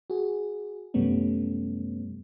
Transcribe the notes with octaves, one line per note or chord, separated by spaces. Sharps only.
F#4 G#4
F#2 C3 G3 A3 B3 C#4